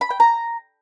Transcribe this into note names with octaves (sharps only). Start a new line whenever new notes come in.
B5
G5
A#5